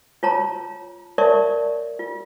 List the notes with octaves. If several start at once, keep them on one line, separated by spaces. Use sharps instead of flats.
F4 C#5 A5 A#5
A#4 C#5 D5 E5 A5 C#6
F4